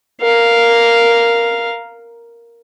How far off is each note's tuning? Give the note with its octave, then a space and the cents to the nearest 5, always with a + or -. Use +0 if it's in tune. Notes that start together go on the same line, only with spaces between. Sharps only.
A#4 +0 F5 +0